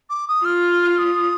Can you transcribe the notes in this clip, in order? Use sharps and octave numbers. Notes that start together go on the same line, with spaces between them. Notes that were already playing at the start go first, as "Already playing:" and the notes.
D6
D#6
F4 F6
D#6